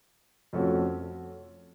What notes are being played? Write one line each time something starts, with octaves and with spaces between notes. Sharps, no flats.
F2 F3 A3 C#4 F#4